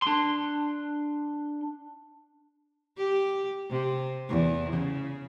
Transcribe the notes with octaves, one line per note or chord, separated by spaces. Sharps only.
D4 C6
G4
C3
E2
C#3